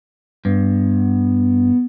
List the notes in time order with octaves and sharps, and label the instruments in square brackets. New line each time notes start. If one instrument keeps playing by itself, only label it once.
[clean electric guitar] G2 [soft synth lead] B3